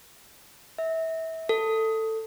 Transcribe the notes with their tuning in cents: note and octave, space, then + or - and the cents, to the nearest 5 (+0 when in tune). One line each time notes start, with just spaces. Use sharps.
E5 -30
A4 +15